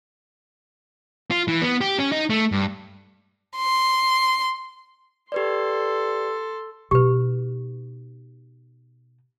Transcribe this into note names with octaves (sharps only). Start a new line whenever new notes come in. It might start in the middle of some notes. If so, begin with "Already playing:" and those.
F4
E3
B3
G4
C#4
D#4
A3
G2
C6
G4 A4 B4 D5 C6
B2 D#4 G4 B4